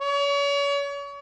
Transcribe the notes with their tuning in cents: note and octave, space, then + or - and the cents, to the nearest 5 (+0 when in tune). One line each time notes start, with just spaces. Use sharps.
C#5 +35